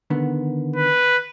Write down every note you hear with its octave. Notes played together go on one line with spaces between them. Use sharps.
D3 D#3 B3
B4